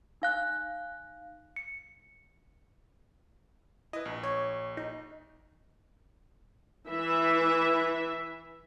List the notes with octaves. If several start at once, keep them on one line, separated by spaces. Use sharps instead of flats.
D#4 F5 F#6
C#7
E4 B4 D#5
A#1
C#5
D#4
E3 E4 E5